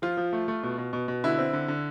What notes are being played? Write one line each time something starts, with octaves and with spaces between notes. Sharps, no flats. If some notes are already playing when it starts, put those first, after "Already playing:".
F3 F4
F3
A3
A3
B2
B2
B2
B2
D3 E4
C4
D3
D3